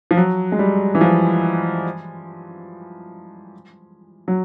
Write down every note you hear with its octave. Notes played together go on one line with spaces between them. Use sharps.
F3
F#3
G#3
G3
E3
F3
F#3